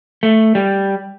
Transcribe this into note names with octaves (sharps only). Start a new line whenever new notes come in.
A3
G3